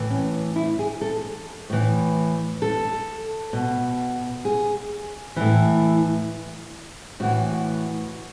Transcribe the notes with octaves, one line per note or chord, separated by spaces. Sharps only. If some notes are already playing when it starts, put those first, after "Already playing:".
Already playing: A2 E3
C#4
E4
G#4
A4
A2 E3
A4
B2
G#4
A2 E3 E4
A2 E3 F#4